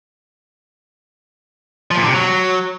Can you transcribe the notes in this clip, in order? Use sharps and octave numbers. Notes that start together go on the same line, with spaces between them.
F3
A#2
D3
C3
F#3